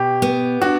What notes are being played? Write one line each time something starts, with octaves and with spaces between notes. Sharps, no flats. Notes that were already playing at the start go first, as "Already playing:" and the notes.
Already playing: B2 G4
B3
D4 F#4